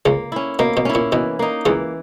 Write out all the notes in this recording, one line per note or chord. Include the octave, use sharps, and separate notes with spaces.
C#2 C#3 A#3
C#4 E4
B2 A#3
B2
C#4 E4
A#2
B2 E3
A#3 D#4
C#2 C#3 E3